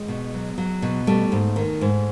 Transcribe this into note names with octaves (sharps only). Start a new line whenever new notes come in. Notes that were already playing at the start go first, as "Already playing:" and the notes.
Already playing: G#3
B2
F#3
F#3
B2
G3 A3
G#2
D#3
G#2